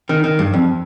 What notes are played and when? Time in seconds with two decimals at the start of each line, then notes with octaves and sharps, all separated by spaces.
0.09 D#3
0.24 D#3
0.39 G2
0.54 F2